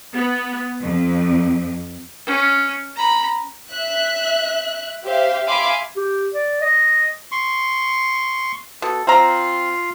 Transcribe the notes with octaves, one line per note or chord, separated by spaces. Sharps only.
B3
F2
C#4
A#5 B5
E5 F#6
G4 C5 E5 F5
E5 F5 G#5 B5 C6 D6
G4
D5
D#5
C6 C#6
B2 A4
C4 F4 F5 A#5